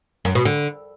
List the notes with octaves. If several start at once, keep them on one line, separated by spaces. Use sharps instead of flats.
F#2
B2
D3